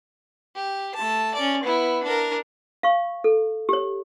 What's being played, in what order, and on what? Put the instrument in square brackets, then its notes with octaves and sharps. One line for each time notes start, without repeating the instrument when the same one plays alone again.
[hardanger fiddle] G4
A3 A5
C#4 D5
B3 E4
D4 A#4
[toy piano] F5 C#6
A4
G4 C#5